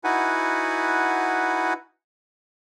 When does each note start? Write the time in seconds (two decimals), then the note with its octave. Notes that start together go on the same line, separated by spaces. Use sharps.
0.04 D#4 E4 F#4 B4 F#5 G#5